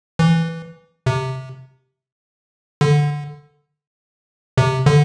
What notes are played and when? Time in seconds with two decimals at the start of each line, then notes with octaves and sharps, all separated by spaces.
0.19 E3
1.06 C3
2.81 D3
4.58 C3
4.86 D3